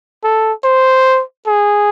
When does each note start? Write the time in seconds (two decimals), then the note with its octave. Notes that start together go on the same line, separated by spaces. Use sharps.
0.24 A4
0.64 C5
1.47 G#4